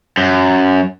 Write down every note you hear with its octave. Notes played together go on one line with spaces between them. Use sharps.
F#2